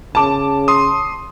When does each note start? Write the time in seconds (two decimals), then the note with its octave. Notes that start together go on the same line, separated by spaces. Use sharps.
0.15 C#3 A5 D6
0.68 C6 D#6